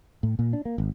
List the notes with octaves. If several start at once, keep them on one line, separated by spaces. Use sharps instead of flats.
A2
A#2
D4
A#3
G#1